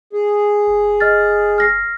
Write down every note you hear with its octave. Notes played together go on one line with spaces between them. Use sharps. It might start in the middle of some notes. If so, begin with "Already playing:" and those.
G#4
F#1
D#5 F6 A6
F6 A#6 C7